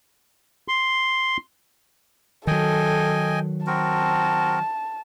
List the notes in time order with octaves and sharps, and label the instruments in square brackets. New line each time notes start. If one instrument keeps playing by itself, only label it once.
[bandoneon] C6
[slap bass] D#3 F#3 [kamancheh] A4 [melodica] D#5 G5 G#5
[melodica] C4 F#4 A#4 [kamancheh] A5